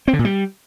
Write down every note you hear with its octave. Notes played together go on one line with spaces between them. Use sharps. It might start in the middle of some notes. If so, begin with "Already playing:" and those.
C4
D3
A#2
G3